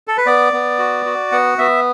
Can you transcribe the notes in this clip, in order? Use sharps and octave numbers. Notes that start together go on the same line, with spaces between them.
A4
B4
B3 D5
B3
F#4
F#4
B3 F#5
B3 E5